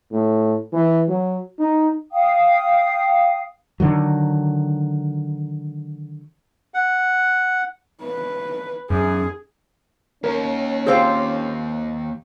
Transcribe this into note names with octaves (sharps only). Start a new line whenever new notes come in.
A2
E3
F#3
D#4
F5 G5 D#6
D3 D#3 F#3
F#5
B4
F#2 G#4
D#2 C#4 A#4
C4 F4 G4 G#4 C5